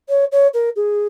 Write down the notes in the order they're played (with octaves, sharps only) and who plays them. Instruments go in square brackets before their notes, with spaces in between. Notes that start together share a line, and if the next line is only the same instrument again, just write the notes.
[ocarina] C#5
C#5
A#4
G#4